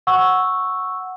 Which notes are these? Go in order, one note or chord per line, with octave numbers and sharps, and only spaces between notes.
F#5 C#6 E6